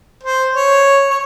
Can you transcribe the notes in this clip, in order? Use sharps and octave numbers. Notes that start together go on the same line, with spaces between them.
C5
C#5
C#5